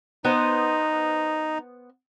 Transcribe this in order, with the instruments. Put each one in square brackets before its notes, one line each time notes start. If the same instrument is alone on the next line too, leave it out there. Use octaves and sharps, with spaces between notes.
[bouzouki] B3 C5 [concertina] D#4